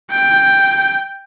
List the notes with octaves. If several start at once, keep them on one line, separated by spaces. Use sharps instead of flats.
G5